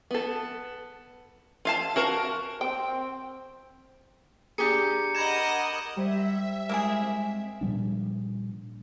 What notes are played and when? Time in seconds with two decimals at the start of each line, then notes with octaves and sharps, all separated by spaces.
0.11 B3 A4
1.65 F4 F5 A5
1.96 F#4 A#4 A5
2.61 C4 G5
4.58 D4 G4 G#4 A#5 D6 G6 C#7
5.15 A#4 D#5 F#5 B5 G6 G#6 A#6 E7
5.96 G3 C5 E5
6.69 G#3 A#3 E4 G#4
7.03 C4
7.61 A#2 F3 G3 D4